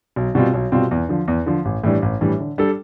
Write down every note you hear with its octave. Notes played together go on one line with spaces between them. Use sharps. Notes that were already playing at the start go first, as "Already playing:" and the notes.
B1
B2 G3 C4 F4
B1
B2 G3 C4 F4
E2
D3 F3
E2
D3 F3
A1
A2 E3 G3 D4
A1
A2 E3 G3 D4
D3
G3 D4 A4